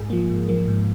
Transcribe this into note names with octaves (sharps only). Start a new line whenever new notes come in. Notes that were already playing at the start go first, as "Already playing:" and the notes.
Already playing: G#2 G#4
F3 A#3
G#2
F3 A#3
G#2